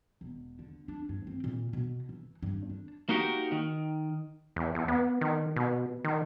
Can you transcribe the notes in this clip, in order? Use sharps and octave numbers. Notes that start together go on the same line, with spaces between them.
E1
D3
D4
G2
C4
A#2
B2
E3
G2
D4
A#3 D#4 F#4 G4 A#4
D#3
E2
E2
B3
D#3
B2
D#3